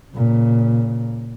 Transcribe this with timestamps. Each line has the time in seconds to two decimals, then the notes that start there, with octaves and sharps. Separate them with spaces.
0.14 A#2 C#3